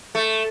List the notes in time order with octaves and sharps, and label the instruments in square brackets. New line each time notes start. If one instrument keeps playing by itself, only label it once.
[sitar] A3